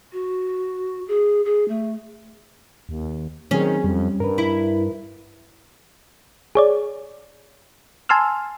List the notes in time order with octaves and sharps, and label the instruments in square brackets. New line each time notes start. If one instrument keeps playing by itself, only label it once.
[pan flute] F#4
G#4
G#4
A3
[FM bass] D#2
[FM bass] D#3 [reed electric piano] F#3 C4 G#4 [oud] C#4
[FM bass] F2 [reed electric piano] G3
[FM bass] G2 [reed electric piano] A#4 B4
[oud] E4
[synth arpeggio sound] G#4 C#5 D5
G#5 A5 C6 E6 F6